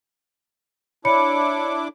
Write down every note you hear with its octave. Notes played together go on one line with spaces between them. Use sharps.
D4 E4 C#5 B5 D6 C#7